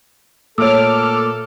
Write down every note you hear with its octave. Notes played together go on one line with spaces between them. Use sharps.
A#2 A3 A4 C#5 D6 E6 F6